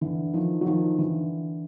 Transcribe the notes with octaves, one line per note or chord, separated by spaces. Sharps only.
D3 E3
D#3 F3
F#3
D#3 F3
D3 E3